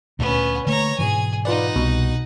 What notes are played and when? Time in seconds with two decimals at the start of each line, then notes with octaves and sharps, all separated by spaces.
0.19 D2 A#2 B3 C#4
0.67 D3 A3 A#3 C#5 A#5
0.99 G#2 B2 E3 G#4 G#5
1.45 D#4 F4 B4 D5 F#5
1.76 C2 B2